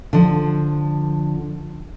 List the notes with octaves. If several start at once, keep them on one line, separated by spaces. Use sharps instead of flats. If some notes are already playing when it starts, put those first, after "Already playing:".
D3 F3